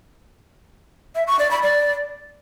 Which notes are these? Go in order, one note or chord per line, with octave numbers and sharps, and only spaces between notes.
E5
C#6
D5
B5
D5